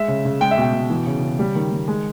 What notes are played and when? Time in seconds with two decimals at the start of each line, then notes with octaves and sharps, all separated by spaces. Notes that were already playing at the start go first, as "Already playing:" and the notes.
Already playing: G#3 E5
0.08 C#3
0.25 C#3
0.41 G#3 G5
0.51 E5
0.58 B2 G5
0.73 B2
0.90 E3
1.06 C#3
1.22 C#3
1.39 G3
1.55 D#3
1.72 D#3
1.88 G#3